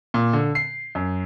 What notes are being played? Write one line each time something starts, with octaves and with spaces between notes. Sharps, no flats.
A#2
D3
C7
F#2